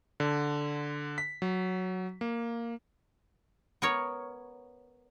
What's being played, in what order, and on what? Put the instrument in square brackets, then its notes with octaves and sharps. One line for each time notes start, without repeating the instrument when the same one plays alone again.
[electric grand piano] D3
B6
F#3
A#3
[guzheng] B3 A#4 C#5